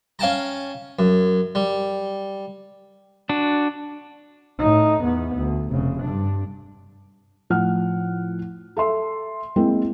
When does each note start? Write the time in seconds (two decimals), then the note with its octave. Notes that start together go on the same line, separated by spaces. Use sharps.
0.19 C#4 F5 G5 A5 A#5
0.99 F#2
1.55 G3
3.29 D4 F#4
4.59 A2 D#4
5.03 E2 B3
5.37 D2
5.71 F1 C#3
6.03 G2 D4
7.50 A2 F3 F#5 F6
8.77 A4 E5 C6
9.56 G#3 A#3 C4 E4